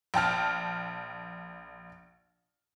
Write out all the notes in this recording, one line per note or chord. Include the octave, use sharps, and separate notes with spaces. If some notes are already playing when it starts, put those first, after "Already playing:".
A#1 G5 A5 F6